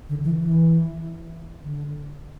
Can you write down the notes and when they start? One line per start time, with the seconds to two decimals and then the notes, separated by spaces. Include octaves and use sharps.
0.09 D3
0.24 E3
0.40 E3
1.63 D3